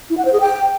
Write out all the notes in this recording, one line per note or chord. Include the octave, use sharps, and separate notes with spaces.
E4
F#5
C5
G#4
G5